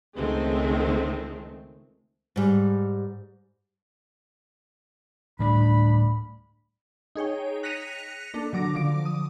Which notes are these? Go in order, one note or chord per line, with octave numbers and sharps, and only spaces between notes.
C#2 D#3 G#3 A3 C4
G#2 G3
D2 A2 G3 D4 B5
D#4 G#4 C#5 G5
F#6 A#6 B6 C#7 D#7 F7
A#3 D4 A4
D3 F#3 D6 A#6
D3 F3 D6 D7
D#6